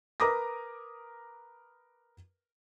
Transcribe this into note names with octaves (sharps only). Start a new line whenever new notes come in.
A#4 B4 A#5 D6 D#6 A#6